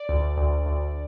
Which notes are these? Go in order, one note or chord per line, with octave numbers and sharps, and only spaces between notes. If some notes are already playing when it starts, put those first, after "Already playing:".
Already playing: D5
D2
D2
D2